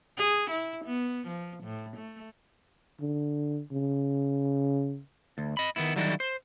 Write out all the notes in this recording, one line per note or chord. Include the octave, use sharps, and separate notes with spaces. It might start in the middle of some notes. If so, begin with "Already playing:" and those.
G#4
E4
B3
F3
A2
A3
D3
C#3
D2
D#5 B5
D#3 B3 E4
D3 D#3 F#3 G3 E4 F#4
C5